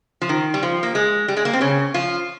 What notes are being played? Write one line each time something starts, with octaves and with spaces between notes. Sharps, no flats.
F3
D#3
G3
F3
A#3
G#3
G3
G#3
A#3
C4
C#3 C#4
F3 F4